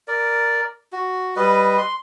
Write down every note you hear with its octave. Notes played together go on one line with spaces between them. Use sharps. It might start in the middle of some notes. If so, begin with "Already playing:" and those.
A#4 D5
F#4
G3 B4 D#5
C6